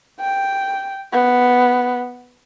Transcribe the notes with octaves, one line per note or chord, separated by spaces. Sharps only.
G5
B3